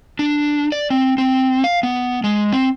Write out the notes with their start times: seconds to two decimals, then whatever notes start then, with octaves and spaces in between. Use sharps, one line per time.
0.19 D4
0.72 D5
0.90 C4
1.18 C4
1.64 F5
1.83 B3
2.24 G#3
2.53 C4